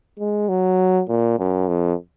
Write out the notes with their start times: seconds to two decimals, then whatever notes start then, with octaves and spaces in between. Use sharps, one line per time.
0.19 G#3
0.49 F#3
1.08 A#2
1.39 F#2
1.68 F2